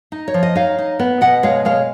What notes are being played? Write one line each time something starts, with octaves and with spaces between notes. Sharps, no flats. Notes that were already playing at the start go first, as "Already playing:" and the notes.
D#4
C#5
F3
D#5
D#4 C#5 F5
D#4
B3
B2 D#5 F#5
G#3 C#5 F5
G#3 C#5 F5